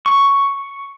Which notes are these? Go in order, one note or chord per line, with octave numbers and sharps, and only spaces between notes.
C#6